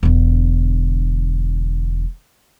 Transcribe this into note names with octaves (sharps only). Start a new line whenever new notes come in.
E1 D3